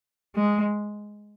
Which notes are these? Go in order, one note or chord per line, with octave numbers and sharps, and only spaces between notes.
G#3